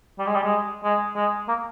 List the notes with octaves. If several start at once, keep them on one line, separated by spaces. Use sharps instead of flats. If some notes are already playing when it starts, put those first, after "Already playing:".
G3
G#3
G3
G#3
G#3
G#3
A#3